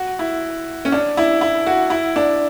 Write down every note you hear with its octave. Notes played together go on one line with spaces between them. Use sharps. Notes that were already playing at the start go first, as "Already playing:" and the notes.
Already playing: F#4
E4
C#4
D4
E4
E4
F#4
E4
D4